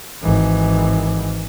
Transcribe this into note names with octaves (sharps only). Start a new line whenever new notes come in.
G#1 E3